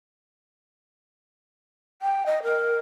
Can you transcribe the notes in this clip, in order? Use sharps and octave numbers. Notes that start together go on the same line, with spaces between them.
G5
D#5
A#4